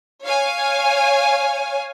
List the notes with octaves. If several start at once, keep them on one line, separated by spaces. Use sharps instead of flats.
C#5 F5 G#5